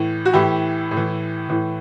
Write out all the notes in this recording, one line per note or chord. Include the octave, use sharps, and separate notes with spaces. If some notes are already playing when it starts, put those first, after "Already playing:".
Already playing: A2 E3
F#4
A2 E3 E4 G4
A2
E3
A2 E3